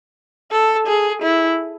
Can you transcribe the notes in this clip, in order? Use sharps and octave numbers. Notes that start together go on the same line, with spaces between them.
A4
G#4
E4